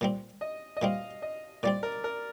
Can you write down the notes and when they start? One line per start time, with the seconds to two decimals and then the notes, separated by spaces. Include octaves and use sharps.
0.01 A#2 G3 C4
0.41 D#5
0.77 D#5
0.82 A#2 G3 C4 F5
1.22 D#5
1.63 A#2 G3 C4 D5
1.83 A#4
2.04 A#4